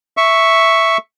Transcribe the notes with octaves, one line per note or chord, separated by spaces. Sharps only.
E5 C#6